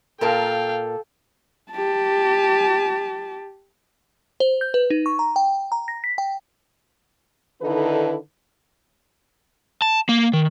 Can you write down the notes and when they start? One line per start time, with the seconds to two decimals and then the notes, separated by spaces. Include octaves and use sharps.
0.21 A#2 A4 A#4 F5 G5 A5
1.72 G4 A5
4.40 C5
4.61 G6
4.74 B4
4.90 D#4
5.06 C#6
5.19 A#5
5.36 G5
5.72 A#5
5.88 A#6
6.04 B6
6.18 G5
7.61 D3 D#3 D#4 E4 A4 B4
9.82 A5
10.09 A#3
10.33 D#3